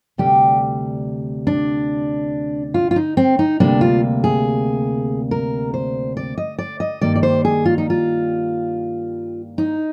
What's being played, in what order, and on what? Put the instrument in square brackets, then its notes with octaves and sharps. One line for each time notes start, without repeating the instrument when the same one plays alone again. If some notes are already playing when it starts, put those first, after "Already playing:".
[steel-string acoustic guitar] D2 C3 G3 G4
D4
F4
F4
D#4
C4
D#4
D2 C3 G3 A#3 D4
F4
G#4
A#4
C5
D5
D#5
D5
D#5
G2 D#3 G3 A#3 D5
D5
C5
G#4
F4
D#4
F4
D#4